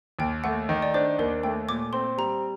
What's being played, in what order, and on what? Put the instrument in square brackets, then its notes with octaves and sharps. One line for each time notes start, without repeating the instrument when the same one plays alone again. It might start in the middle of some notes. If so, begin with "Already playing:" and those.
[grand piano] D#2 [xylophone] G5
[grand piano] A3 [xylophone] F#5
[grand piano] D#3
[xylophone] D5
[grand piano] D4 [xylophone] C5
[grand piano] D#2 [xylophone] A#4
[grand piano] A3 [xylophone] G5
[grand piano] A#2 [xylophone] D6
[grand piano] C4 [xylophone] C6
[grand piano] G3 [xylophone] A#5